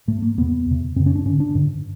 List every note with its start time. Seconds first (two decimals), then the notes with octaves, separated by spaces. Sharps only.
0.08 G#2 A3
0.22 A#3
0.38 E2 C3 B3
0.66 E2 C3
0.96 F#2 C#3 C4
1.06 C#4
1.15 D4
1.25 G2 D3 C#4
1.40 D4
1.55 G2 D3